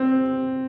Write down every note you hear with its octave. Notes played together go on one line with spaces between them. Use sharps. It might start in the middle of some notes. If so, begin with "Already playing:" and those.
Already playing: C4